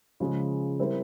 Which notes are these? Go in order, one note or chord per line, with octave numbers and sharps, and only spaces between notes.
C#3 F3 G#3
G3 C4 E4 A#4